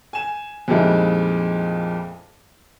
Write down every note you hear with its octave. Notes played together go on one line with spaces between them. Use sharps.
G#5 E7
F2 A#2 G3 G#3 D#4 E4